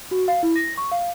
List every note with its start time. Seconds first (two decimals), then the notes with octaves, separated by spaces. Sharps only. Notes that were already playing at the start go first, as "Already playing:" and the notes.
0.11 F#4
0.28 F5
0.43 E4
0.56 A#6
0.78 C#6
0.92 F5